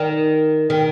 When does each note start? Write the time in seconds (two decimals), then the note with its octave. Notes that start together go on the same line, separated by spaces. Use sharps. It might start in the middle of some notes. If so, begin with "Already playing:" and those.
Already playing: D#3
0.70 D#3